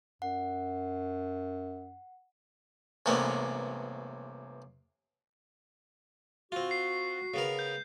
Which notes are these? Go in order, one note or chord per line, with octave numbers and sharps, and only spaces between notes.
F#2 F#5
A1 G2 C3 A#3 B3 C#4
C4 F4 F#4
C7
C#3 B3 A#4
G6